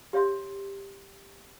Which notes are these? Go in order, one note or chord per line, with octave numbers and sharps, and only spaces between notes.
G4 C#5 E5 C6